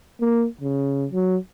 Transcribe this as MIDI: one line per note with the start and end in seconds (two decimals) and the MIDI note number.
0.21 0.46 58
0.61 1.06 49
1.12 1.37 54